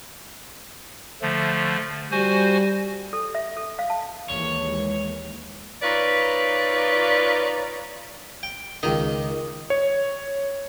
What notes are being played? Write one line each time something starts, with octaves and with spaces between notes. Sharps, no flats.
D3 F3 A3
G3 F#4 C5 G#5
A4
E5
A4
F5
A5
D#2 E3 G#3 C#5
D#4 F4 B4 C#5 D5
G5
C#2 D#3 D#5
C#5